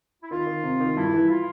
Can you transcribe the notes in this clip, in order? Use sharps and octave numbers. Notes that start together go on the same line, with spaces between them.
E4
D#3 F4
D#3
C3
D#3
G2 E4
E3
F4